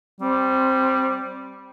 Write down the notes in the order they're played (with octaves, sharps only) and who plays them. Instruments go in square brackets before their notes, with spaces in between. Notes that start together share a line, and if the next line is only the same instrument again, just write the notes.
[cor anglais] G3 [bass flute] C4